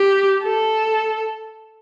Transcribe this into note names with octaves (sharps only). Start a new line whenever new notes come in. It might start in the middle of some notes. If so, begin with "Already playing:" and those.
Already playing: G4
A4